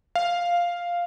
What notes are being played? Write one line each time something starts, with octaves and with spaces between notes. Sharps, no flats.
F5